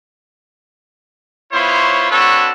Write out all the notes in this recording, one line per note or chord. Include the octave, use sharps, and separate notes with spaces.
B3 E4 F4 C5 C#5
C4 D4 F#4 A4 B4 C#5